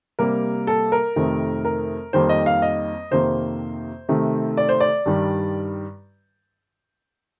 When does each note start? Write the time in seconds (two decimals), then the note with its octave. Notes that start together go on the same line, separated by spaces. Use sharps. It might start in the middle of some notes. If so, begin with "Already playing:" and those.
0.19 C3 G3 A#3 A#4
0.67 A4
0.92 A#4
1.16 F2 C3 D#3 A3
1.65 A#4
2.13 F2 D#3 G3 A#3 C5
2.29 D#5
2.46 F5
2.62 D#5
3.11 F2 C3 D#3 A#3 C5
4.09 C3 D#3 A3
4.57 D5
4.69 C5
4.80 D5
5.06 G2 D#3 G3